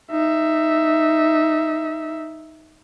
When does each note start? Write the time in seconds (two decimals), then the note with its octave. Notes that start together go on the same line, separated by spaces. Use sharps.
0.11 D#4 E5